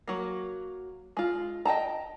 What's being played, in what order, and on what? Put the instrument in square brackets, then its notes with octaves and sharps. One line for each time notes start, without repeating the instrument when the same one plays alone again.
[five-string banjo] F#3 A#3
G#3 F4
D#5 G5 A5 A#5